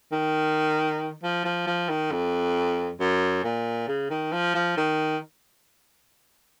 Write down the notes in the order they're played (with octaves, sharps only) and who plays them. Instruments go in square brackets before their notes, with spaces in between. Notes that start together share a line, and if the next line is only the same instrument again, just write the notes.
[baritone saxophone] D#3
F3
F3
F3
D#3
F2
F#2
A#2
C#3
D#3
F3
F3
D#3